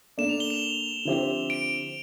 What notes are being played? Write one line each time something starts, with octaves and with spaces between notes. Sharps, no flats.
A#3 D4 A4 D5 E7
F7
G7
F7
D3 F3 C4 E4 G4
D7